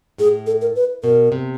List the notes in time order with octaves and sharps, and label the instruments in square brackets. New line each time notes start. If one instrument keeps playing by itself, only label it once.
[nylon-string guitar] A2 [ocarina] G#4
[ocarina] A4
A#4
B4
[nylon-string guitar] B2 [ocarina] A#4
[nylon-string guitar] C3